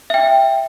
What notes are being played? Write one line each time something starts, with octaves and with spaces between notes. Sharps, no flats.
E5 G5